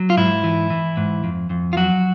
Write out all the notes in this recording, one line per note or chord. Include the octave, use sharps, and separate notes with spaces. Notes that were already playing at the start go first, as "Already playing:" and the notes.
Already playing: F#3
F4
G#2 E4
E3
E3
G#2
F2
F2
F4
F#3 F#4